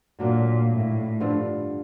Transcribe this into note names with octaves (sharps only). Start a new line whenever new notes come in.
A#2 D3 F#3 A#3 D4
A2
G2 D3 F3 A3